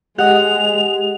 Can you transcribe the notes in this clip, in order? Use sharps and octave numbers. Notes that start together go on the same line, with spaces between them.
G#3 G4 D#5 F#5 F7